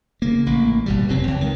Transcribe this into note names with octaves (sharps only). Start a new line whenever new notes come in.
C#3 A#3
A1 A#3
G#1 B2 G3
F1 C3 F#3 C4
C#2
D#3